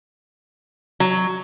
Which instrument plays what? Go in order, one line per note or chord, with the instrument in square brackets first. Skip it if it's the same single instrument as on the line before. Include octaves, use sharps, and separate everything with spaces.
[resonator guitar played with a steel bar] F#3